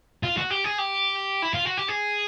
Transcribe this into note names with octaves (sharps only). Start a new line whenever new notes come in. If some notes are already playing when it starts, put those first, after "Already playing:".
F4
F#4
G4
G#4
G4
E4
F4
F#4
G4
G#4